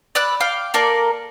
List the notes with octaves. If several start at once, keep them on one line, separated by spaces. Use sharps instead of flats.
D5 B5 E6 F#6
F5 G5 D6
A#3 A4 A#4 D5